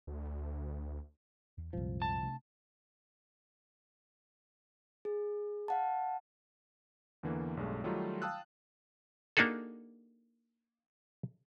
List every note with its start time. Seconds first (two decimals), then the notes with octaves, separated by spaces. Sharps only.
0.07 D2
1.58 E2
1.73 C2 F#2 A#2 F3 G#3
2.02 A5
2.23 C3 A3 D4
5.05 G#4
5.68 F5 F#5 A5
7.23 E2 D3 E3 A#3
7.57 B1 G2 G#3 A3
7.84 D#3 F#3 G3 A3 D#4 F4
8.22 F5 G5 A5 D#6 E6 F#6
9.37 A#3 D4 D#4 F#4 G#4 A4